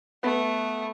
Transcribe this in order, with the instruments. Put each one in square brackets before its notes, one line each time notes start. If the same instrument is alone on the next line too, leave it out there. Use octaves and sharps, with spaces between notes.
[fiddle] A3 [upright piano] B3